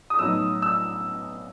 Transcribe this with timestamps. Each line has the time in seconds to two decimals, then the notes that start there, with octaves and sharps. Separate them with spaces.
0.10 D#6
0.19 A2 F#3 B3 D#4 E6
0.62 E6